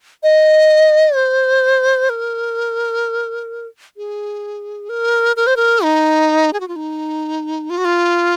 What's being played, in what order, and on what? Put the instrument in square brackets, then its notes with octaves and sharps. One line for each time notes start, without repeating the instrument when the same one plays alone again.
[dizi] D#5
C5
A#4
G#4
A#4
A#4
C5
A#4
D#4
G#4
F#4
F4
D#4
F4
F#4
F4